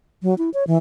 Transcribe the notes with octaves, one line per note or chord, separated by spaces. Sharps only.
F#3
E4
C#5
E3